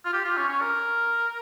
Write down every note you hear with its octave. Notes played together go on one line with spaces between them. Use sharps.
F4
G4
F4
C#4
C#4
A#4